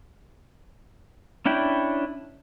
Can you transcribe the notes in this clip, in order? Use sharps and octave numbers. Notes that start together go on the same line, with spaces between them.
C#4 D4 E4 G5